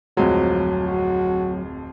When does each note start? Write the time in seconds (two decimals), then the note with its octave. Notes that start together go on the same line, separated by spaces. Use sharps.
0.17 D1 F2 F3 F#3 G#3
0.85 F#4